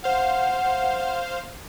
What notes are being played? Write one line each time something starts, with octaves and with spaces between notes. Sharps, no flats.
C5 F5 F#5